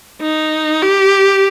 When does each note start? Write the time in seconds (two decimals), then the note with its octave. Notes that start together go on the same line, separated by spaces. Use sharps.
0.22 D#4
0.83 G4